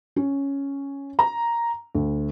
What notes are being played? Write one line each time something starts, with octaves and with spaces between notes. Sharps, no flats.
C#4
A#5
D2